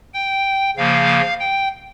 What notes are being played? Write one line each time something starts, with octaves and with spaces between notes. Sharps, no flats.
G5
C#3 F3 A#3 F5
G5